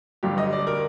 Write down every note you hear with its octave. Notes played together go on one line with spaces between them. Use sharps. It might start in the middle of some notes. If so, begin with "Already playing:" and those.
G1 G2 D3 G3 G4
D#5
D5
A#4